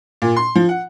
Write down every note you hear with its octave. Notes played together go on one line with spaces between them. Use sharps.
A#2
C6
F3
F#5